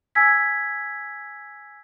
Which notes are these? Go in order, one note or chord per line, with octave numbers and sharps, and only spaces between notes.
G#5 E6 G#6 B6